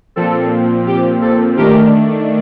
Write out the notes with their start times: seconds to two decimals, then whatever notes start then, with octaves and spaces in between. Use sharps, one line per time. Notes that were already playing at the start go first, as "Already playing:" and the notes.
0.16 A#2 F3 C4 A4
0.87 G4
1.22 A4
1.57 D#3 A3 D4 G4 A#4